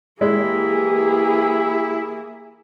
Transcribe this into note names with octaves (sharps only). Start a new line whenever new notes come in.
E3 G#3 A#3 E4 G4 G#4